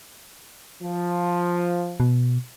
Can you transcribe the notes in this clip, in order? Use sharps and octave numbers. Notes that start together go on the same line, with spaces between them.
F3
B2